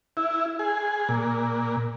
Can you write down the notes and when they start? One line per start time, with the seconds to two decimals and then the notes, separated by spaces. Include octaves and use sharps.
0.17 E4
0.59 G#4
1.09 A#2